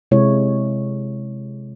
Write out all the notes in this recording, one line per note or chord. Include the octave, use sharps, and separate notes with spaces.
C3 G#3 E4 C#5